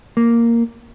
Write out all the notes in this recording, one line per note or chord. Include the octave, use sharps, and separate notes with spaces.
A#3